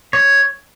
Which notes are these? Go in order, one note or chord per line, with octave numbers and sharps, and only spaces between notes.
C#5